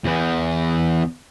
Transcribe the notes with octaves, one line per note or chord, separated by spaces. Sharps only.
E2 E3